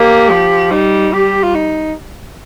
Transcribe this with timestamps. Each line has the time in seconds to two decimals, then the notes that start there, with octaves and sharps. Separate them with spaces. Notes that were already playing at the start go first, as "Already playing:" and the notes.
Already playing: A#3 G4
0.30 F3
0.71 G3 D#4
1.13 G3 G4
1.43 F4
1.55 D#4